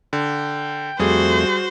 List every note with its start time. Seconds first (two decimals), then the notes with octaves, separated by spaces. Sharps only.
0.13 D3 G5
0.99 F2 G3 A3 F#4 G#4 C5